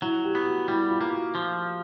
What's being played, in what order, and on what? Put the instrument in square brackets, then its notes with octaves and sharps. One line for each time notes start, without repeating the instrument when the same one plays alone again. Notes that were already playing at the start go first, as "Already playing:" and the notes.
[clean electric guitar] F#3 [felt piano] E4
[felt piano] G4
[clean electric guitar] B3
[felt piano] F#4
[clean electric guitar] G3 [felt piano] E4
[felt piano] F4
[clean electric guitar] A#3
[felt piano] F#4
[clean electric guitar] F3